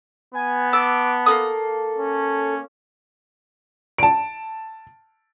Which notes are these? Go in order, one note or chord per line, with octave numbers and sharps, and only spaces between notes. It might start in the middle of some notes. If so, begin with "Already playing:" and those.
B3 G#5
A5 D6 E6
A#3 E4 A4 D#6
C#4
A5 D7